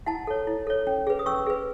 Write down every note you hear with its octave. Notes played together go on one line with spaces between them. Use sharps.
E4 F#5 A5
A4 C#5
E4
A4 C#5
C#4
G#4 B4
D#6
C#4 C#6 E6
G#4 B4